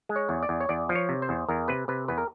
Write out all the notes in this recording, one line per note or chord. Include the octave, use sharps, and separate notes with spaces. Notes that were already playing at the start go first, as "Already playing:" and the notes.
G#3
C#5
E2
D5
E2
C#5
E2 D5
F3
C#5
C3
C5
E2
E2 A#4
C3 B4
C3 B4
E2 B4
A#4